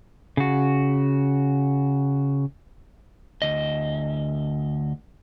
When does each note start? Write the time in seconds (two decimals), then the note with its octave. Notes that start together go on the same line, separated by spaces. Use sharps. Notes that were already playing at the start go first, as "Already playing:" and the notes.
0.37 C#3 F#4
3.42 D2 D#5